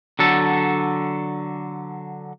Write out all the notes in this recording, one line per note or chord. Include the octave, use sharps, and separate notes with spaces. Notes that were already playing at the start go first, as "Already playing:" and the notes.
D3 F#3 A4